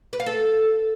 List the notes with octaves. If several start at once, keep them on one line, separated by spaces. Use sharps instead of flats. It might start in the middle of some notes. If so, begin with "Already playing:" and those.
B4
F5
A4